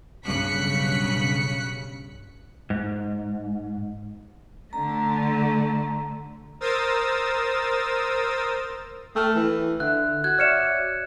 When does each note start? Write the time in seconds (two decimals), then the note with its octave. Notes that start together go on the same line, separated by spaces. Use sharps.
0.25 B1 G2 C#3 F#6 B6 C#7
2.70 G#2
4.73 D3 A3 A#5
6.60 A#4 C5 D#6 E6 A6
9.16 A3 G5 E6 F6
9.36 E3
9.80 D3 E5 F#6
10.24 F#4 F#6 G#6
10.39 C#5 D5 E5 F6 C#7 E7